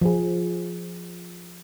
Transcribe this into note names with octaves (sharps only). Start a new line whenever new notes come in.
F3 G#4